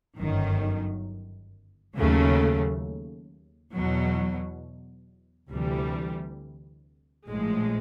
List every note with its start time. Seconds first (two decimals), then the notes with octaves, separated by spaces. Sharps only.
0.17 G1 F#2 D#3
1.95 D#2 C#3 F#3 A3
3.73 E2 B2 F#3
5.51 D2 C3 E3 G3
7.28 A#1 A2 F3 G#3